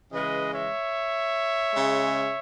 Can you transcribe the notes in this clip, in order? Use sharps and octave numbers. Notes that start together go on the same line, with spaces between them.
C#3 E3 G#3 B4 D#5
C#5 E5
C#3 G#3